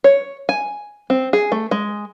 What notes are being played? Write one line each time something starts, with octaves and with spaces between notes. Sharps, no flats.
C#5
G#5
C4
G#4
A3
G#3